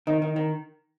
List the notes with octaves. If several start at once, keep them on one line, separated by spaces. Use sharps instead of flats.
D#3 D#4
D#3
D#3